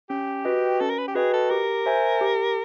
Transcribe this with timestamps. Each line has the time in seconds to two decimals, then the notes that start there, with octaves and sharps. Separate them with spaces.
0.09 C#4 G4
0.45 F#4 B4 D#5 G5
0.80 C#4 A4
0.90 A#4
0.98 B4
1.08 G4
1.15 F#4 G#4 B4 D#5 G5
1.33 A4
1.50 G4 A#4
1.86 C5 E5 G#5
2.21 G4